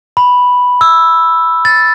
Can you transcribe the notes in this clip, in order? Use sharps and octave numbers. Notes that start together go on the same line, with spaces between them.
B5
E6
A6